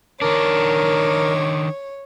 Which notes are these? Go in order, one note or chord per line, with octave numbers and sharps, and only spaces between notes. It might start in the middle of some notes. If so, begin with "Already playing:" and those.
D#3 D4 A#4 C#5